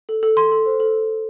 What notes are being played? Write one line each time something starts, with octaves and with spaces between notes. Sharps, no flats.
A4
A4
A4 C6
A4
C5
A4